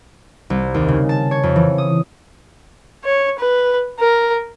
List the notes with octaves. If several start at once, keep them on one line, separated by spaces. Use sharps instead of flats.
C2
D#2
C#3
A5
C#5
F2
E3
D#6
C#5
B4
A#4